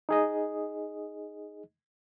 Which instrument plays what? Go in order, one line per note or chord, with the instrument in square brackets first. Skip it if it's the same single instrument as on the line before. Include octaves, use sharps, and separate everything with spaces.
[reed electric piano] D#4 G#4 D#5